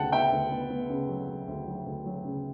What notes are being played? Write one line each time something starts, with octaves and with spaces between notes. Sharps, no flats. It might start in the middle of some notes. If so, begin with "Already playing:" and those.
Already playing: D2 C#3 B3 F#5 G5 A5
B3 E5 G5
D2
B3
B3
C#3
F#3
F#3
D2
F#3
D2
F#3
C#3